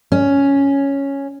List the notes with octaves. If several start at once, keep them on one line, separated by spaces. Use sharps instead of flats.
C#4